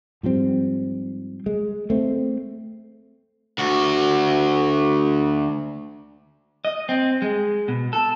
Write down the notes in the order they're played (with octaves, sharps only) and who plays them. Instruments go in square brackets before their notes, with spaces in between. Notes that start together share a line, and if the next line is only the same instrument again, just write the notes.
[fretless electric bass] G#2 F3 G3 C4
G#3
A3 C4
[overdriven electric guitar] D2 F#4
[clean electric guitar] D#5
C4
G#3
B2
A4